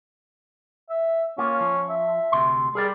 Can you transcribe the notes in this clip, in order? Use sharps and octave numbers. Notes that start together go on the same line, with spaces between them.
E5
A#3 C#4 F4
F3
E5
D2 C3 C6
G3 G#4 A#4 D5